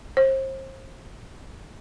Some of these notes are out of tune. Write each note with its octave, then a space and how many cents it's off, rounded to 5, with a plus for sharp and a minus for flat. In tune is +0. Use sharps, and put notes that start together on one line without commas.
C5 +35